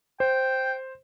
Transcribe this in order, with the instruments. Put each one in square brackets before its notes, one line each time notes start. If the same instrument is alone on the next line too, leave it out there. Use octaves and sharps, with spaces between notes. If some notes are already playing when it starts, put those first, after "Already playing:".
[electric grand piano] C5 [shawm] G5